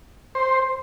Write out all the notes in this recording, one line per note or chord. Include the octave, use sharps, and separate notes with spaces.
C5